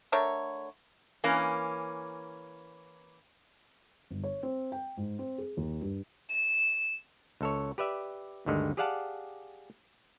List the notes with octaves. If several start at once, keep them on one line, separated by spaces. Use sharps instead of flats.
D3 A3 A#4 C#5
E3 A#3 C#4
G1
C#5
C4
G5
G#2
C4
G#4
D#2
G2
E7
C#2 A4 C#5
G4 B4 D5 E5
D2 G2 D3 D#3 G#3
G4 G#4 D5 F5 F#5 A5